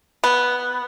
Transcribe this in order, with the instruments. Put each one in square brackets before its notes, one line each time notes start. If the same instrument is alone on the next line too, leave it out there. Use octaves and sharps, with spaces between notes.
[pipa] B3